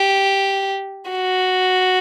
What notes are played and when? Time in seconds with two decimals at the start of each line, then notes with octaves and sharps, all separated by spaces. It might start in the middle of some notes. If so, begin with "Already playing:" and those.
Already playing: G4
1.11 F#4